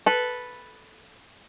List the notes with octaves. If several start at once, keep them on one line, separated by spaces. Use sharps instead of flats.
A4 B4